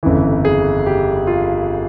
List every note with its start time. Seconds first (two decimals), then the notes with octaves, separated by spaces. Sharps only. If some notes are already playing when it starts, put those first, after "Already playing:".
0.03 G1 F2 C#3 E3
0.45 G#4
0.86 G4
1.27 F4